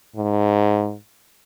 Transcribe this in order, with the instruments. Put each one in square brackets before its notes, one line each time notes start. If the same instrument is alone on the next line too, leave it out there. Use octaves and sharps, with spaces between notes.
[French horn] G#2